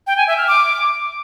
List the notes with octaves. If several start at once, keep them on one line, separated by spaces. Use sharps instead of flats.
G5
G#5
E5
F6
D6